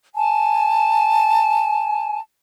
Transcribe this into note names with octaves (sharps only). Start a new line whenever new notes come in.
G#5 A5